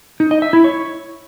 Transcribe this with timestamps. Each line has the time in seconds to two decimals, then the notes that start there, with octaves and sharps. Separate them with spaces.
0.20 D#4
0.31 D#5
0.42 E5
0.53 E4
0.64 C#5